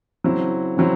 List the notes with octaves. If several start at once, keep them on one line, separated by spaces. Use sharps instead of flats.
C#3 F#3 C4 E4
C#3 F#3 C4 E4